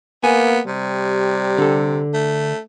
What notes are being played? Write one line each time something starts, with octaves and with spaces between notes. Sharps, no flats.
A#3 B3 G#5
C3 G3
D3 A4
A3